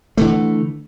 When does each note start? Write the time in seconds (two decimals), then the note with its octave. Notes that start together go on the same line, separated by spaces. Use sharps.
0.17 D3 E3 A3